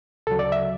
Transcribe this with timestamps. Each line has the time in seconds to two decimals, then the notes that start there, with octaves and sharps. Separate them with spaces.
0.27 D2 C#3 F#3 A4
0.39 D5
0.52 E5